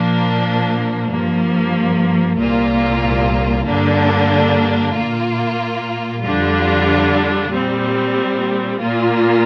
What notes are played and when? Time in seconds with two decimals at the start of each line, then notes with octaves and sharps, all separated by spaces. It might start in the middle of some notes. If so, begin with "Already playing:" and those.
Already playing: A#2 F3 A#3 D4
1.08 G2 F3 A#3
2.36 C2 A#2 A#3 F4
3.65 G2 D3 A#3 D4
4.93 A#2 A#3 F4
6.21 F2 D3 G3 D4 F4
7.50 A#2 G3 C4
8.78 A#2 A#3 F4